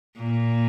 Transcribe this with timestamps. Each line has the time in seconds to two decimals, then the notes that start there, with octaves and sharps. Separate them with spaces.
0.17 A#2